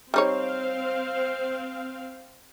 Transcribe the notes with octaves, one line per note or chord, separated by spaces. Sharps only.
G3 C4 D#4 C5 C#5 F5